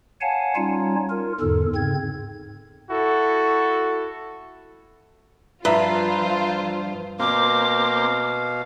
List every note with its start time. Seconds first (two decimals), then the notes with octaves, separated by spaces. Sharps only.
0.21 C#5 F5 F#5 G#5 A5
0.56 G3 C#4 D#4 F4 C#5
1.10 F4 A#4
1.40 E2 G#2 D3 A4
1.75 G#2 C#3 C4 G#6
2.89 E4 F#4 A4
5.65 G2 F3 F4 B4 C5 E5 A#5
7.20 B2 A#3 C4 F5 D6